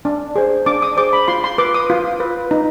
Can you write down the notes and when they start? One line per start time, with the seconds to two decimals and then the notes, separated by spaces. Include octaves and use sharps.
0.05 D4
0.36 G#4 C5
0.66 D4 D6
0.82 D#6
0.97 G#4 C5 D6
1.13 B5
1.28 F4 C6
1.44 C6
1.58 B4 D6
1.74 D#6
1.90 F4
2.20 B4
2.51 D#4